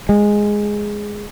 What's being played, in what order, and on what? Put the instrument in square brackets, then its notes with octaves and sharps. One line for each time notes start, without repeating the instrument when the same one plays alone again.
[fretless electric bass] G#3